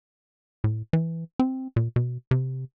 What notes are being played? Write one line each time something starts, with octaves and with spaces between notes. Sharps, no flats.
A2
E3
C4
A#2
B2
C3